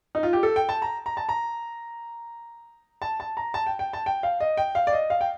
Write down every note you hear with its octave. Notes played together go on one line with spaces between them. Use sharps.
D#4
F4
G4
A4
G5
A5
A#5
A#5
A5
A#5
A5
A5
A#5
A5
G5
G5
A5
G5
F5
D#5
G5
F5
D5
D#5
F5
G5